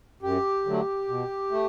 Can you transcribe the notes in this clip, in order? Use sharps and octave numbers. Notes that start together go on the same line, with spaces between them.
F#2 G4
D3 F#3 A3
B2
A3